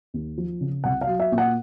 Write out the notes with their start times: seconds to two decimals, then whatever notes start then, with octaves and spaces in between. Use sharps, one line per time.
0.14 D#2
0.38 F3
0.61 C#3
0.84 C2 F#5
1.01 F5
1.07 F#3
1.20 E5
1.32 A#2
1.38 F#5